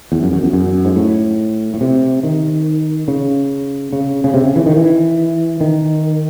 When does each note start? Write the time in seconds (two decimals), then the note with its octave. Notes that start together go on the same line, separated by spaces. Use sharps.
0.12 E2
0.23 F#2
0.33 F#2
0.43 E2
0.53 F#2
0.85 G#2
0.96 A2
1.74 A2
1.81 C3
2.23 D#3
3.08 C#3
3.93 C#3
4.24 C#3
4.34 C3
4.45 C#3
4.56 E3
4.66 D#3
4.77 E3
5.61 D#3